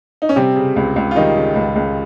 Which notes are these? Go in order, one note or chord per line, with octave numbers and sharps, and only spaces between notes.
D#4
C#4
C3 G3 C4
C#3
C#2
C#2
F4
D#3 G3 D#4
C#3
C#2
C#2